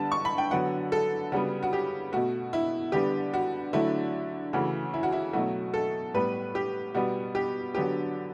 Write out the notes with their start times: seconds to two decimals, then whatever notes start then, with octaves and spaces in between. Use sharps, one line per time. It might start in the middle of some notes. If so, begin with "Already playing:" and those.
Already playing: D3 G3 B3 A5
0.12 C#6
0.25 B5
0.38 G5
0.51 D3 F#3 B3 F#5
0.92 A4
1.32 C#3 G3 B3 F#4
1.63 F#4
1.73 G4
2.12 B2 A3 F#4
2.53 E4
2.92 D3 G3 B3 G4
3.34 F#4
3.73 D3 F#3 A3 E4
4.53 C#3 E3 A3 F#4
4.94 E4
5.03 F#4
5.13 E4
5.33 B2 F#3 A3 F#4
5.74 A4
6.14 A2 G3 B3 B4
6.55 G4
6.95 B2 G3 B3 F#4
7.35 G4
7.74 D3 F#3 B3 G4